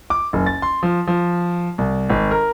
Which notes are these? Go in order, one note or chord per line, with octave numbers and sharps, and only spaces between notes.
D6
F#1
A6
C6
F3
F3
C2
G#1
A#4